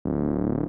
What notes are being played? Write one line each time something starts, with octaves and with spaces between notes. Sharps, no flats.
D1